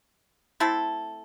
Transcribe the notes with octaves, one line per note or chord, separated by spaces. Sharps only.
A3 C4 E4 A4